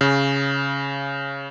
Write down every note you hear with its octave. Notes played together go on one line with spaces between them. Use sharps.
C#3